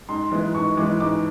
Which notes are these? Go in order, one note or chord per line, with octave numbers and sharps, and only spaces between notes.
G#2 C6
E3 G#3 B3
G#2 C#6
E3 G#3 B3 D6
G#2 D6